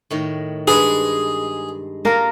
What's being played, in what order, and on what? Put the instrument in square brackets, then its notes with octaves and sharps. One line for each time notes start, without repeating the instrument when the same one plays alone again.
[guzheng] A2 D#3 C#5
[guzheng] G2 G#3 [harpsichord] G#4 [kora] B4
[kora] A#3 A#4 [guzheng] F4 A4 A#5